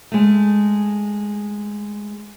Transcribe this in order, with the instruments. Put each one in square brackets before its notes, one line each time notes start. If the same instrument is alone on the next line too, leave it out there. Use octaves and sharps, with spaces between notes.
[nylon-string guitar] G#3 A3